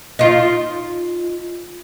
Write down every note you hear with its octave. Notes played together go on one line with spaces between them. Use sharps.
D#4 F4